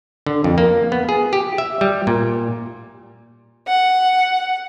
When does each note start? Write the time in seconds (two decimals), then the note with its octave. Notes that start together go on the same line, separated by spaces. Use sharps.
0.26 D3
0.44 F2
0.58 A#3
0.92 B3
1.09 G#4
1.33 G4
1.58 E5
1.81 G3
2.07 A#2
3.67 F#5